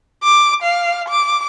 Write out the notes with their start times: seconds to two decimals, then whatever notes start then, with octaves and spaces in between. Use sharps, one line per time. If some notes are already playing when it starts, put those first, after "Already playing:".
0.23 D6
0.63 F5
1.09 D6